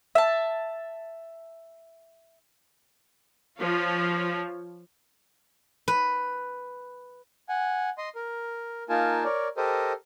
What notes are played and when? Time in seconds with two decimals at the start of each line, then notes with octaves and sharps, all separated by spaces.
0.15 E5 A5
3.60 F3 F4 C#5
5.88 B4
7.49 F#5 G#5
7.98 D#5 C6
8.15 A#4
8.89 A#3 D#4 F4 A#4 G#5 A5
9.24 A#4 C#5 D5
9.57 G4 A4 A#4 C5 D#5